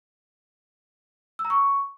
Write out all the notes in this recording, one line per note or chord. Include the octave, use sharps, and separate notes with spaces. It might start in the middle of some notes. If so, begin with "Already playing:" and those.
E6
A#5
C#6